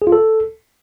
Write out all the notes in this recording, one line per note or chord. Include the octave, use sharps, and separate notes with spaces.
G#4
F4
A4